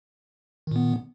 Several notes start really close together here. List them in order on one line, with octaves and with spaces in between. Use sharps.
D#3 A#2 B3